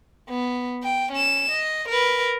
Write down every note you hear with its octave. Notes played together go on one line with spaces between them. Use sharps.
B3
G5
C#4 E7
D#5
A#4 B4